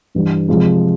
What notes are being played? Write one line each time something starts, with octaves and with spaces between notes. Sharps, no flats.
G2 E3 G3
C3 F3 G#3